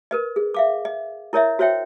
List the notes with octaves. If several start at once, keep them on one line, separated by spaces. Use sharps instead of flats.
A#4 B4 D#5
G#4
E5 F5 D6
D#5
E4 A#4 C#5 D#5 E5
F#4 C5 C#5 E5 G5